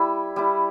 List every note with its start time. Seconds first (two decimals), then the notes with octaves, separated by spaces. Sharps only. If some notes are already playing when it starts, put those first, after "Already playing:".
Already playing: G3 E4
0.36 G3 E4